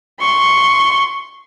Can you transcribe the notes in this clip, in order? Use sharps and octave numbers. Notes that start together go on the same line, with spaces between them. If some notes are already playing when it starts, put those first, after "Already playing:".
C6 C#6